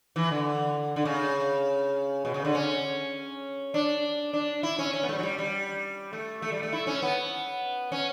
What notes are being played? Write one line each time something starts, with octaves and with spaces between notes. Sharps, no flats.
E3
D3
D3
C#3
B2
C#3
D3
C#4
D4
D4
E4
C#4
C#4
B3
A3
G3
F#3
G3
G3
A3
A3
G3
A3
E4
C#4
B3
C#4